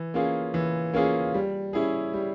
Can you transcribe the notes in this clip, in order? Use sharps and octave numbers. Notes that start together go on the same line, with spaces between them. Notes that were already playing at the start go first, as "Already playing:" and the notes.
Already playing: E3
A#3 C#4 F4 G#4
E3
A#3 C#4 F4 G#4
G3
C#4 E4 G#4
G3